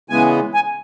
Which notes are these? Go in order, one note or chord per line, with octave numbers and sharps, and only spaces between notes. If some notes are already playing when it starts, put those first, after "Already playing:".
C#3 E3 G#3 B3 G#5
G#5